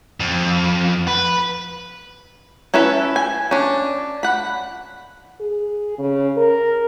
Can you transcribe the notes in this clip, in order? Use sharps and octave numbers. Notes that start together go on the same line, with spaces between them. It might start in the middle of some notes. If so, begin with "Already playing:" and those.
F2
B4
C#4 E4 A4 B4
G#5
C#4 D4
F#5 B5
G#4
C#3
A#4